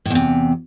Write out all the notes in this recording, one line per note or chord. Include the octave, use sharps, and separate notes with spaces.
E2 A2 C3